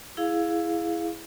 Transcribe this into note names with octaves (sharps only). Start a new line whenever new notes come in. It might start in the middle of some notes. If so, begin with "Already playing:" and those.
E4 G#4 F5